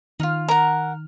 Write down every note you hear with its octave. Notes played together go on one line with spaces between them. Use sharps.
D#3 D#4 F4 F6
A#4 F#5 A#5